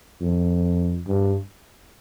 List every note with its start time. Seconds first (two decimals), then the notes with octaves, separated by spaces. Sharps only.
0.21 F2
1.07 G2